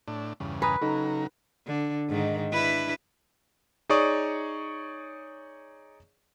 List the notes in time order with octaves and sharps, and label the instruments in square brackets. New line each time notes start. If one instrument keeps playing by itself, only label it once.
[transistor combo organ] A2 D4
E2 G2 C#3
[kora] B4 [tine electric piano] G#5 A#5 D#6
[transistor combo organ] C#3 F#3 A#5 [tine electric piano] D#4 A4
[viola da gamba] D3
G#2 D#3
D4 E4 B4
[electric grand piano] D#4 G#4 C#5 D5 C#6 D#6